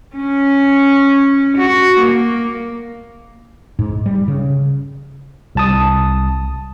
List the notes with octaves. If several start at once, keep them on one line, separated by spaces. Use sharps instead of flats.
C#4
F#4
A#3
G#2
G3
C#3
C2 A5 D#6